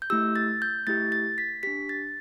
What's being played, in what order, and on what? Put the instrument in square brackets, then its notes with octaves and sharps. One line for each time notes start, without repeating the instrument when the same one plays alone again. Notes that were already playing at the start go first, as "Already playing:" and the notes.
[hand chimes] G6
A3 E4 G4 E6
A6
G6
A3 E4 G4 A6
A6
B6
D4 G4 B6
A6